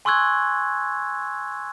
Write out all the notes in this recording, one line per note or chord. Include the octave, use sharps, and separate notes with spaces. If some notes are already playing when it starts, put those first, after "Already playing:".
G#5 C6 C#6 E6 F#6 G#6